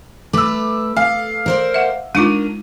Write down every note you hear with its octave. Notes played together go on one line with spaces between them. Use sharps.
A3 B4 D6 E6
A4 F5
A#4 C5 D5
E5 F#5
G#3 D4 D#4 F4 A#4 D#7